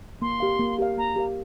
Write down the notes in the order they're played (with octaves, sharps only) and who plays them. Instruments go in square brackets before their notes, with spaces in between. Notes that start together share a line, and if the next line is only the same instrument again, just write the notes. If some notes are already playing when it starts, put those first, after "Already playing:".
[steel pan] A#3 [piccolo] C6
[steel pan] G4 A#4 F5
A#3
G4 A#4 F5
[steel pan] A#3 [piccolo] A#5
[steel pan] G4 A#4 F5